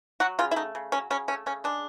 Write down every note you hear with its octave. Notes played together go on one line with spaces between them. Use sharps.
F#3 F#4
C#3 F4
E4
A3 D#4
C#3
F#3 C#4
C#3 C#4
A3 C#4
C#3 C#4
G#3 D4